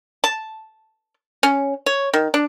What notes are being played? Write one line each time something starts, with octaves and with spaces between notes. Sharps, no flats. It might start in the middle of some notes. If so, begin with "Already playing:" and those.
A5
C#4
C#5
D#3
D4